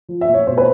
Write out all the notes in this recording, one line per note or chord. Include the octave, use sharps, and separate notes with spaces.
F3
E5
A#2
C#5
B2 C5
B4